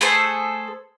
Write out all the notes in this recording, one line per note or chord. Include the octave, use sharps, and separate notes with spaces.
A3 G#4 A4 C5